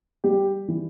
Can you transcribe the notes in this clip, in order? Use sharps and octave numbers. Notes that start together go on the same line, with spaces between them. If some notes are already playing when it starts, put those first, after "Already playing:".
G3 G4
E3